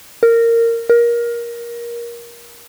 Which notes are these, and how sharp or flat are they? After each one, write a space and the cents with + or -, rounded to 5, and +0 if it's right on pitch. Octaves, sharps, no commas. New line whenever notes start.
A#4 -15
A#4 +20